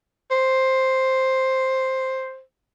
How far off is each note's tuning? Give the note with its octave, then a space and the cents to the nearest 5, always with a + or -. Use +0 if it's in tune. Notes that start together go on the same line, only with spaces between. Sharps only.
C5 +5